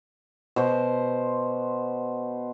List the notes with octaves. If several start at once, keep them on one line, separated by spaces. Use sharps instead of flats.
B2 C5